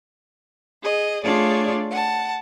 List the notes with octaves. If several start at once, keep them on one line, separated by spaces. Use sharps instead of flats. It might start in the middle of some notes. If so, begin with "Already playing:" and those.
G#4 D#5
A3 D4 F4 G#4 C#5 D5
F#5 A5